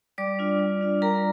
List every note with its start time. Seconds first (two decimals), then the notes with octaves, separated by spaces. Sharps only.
0.18 G3 D5 D6
0.39 D4 F4
0.60 G3
0.81 D4 F4
1.02 G3 A#4 A#5